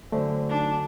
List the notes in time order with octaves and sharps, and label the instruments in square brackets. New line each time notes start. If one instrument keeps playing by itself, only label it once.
[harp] F#2 D3 [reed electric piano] A3 [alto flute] C5
[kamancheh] D4 [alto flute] D#4